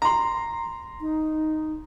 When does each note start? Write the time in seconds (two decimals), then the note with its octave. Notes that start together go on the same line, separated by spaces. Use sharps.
0.02 A#5 C6
1.01 D#4